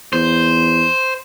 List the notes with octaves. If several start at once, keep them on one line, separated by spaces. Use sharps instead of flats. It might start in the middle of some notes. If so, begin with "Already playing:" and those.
E2 C5